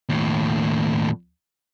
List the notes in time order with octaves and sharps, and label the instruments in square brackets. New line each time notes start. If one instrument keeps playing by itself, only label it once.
[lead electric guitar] D#2 A2